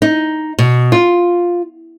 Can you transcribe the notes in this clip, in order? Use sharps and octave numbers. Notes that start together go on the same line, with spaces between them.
D#4
B2
F4